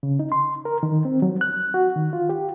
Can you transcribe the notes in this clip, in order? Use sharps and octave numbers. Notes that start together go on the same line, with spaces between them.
C#3
D#4
C6
A#4
D#3
C4
F#3
F#6
F#4
D#3
F4
G4